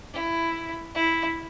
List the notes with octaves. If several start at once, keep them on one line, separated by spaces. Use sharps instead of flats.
E4
E4